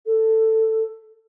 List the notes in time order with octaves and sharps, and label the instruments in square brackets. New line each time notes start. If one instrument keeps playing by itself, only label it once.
[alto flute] A4